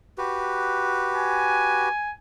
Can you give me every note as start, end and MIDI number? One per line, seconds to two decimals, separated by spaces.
0.18 1.89 66
0.18 1.89 67
0.18 1.89 71
1.15 2.13 80